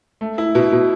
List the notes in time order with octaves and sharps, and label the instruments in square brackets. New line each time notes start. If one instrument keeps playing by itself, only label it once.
[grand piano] A3
E4
B2
B2